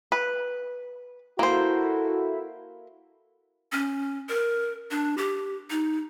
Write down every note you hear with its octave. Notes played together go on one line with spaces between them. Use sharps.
B4
A#3 E4 F#4 A4 C5
C#4
A#4
D4
G4
D#4